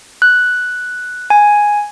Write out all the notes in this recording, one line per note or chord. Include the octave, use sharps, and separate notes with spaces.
F#6
G#5